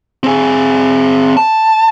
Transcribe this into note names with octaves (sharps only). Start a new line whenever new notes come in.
C4 G#4
A5